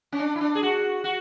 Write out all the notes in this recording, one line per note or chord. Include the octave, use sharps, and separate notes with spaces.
C#4
D4
E4
D4
G#4
F#4
F#4